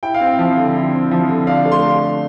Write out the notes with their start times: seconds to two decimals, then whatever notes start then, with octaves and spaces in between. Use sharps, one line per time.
0.03 E4 G5
0.14 F5
0.21 C4
0.27 G5
0.39 F3
0.57 D3
0.75 E4
0.93 C4
1.11 F3
1.29 D3
1.47 D4 F5
1.65 A3
1.72 C6